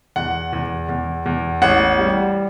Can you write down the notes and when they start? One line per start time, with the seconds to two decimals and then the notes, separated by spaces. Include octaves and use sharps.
0.16 E2 F#5
0.53 E2
0.89 E2
1.26 E2
1.62 A1 F#5
1.99 G3